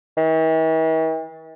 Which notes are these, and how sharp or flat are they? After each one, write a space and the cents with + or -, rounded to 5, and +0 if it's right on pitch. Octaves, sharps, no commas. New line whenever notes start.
E3 -45